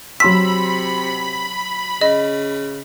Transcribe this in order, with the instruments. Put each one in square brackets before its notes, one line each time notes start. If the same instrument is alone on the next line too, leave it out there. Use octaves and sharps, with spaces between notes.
[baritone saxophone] C3 [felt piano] F#3 C6 E6 [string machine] B5 [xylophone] B6
[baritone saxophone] C#3 [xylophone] D#5